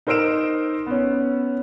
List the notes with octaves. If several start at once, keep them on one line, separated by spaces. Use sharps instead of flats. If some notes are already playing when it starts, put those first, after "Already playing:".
D#4 A#4 C5 E6 D7 E7
B3 C#4